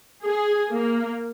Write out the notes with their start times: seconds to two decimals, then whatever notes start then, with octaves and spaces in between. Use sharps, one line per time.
0.23 G#4
0.72 A#3